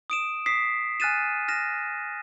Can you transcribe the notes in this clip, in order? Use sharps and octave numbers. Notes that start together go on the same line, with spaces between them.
D#6 D7 E7
D#6 B6 C7
G#5 F6 F#6 A6 D#7 E7
F6 A#6 E7